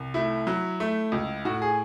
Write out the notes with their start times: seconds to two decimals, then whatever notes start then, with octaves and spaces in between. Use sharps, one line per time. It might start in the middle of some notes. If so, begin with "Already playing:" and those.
Already playing: C2
0.14 A3 E4
0.47 F#3
0.80 A3
1.12 C#2
1.45 A2 F#4
1.62 G#4